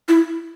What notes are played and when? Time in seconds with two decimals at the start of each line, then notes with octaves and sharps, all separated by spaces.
0.08 E4